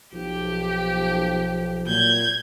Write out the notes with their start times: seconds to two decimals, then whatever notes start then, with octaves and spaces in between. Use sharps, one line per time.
0.14 B1 F3 G4
1.86 A#2 F#3 G6 G#6